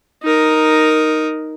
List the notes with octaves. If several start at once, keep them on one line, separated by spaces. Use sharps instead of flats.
D#4 A#4